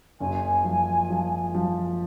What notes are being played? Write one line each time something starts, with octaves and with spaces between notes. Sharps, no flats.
F#1 G#5
F3
F3
F3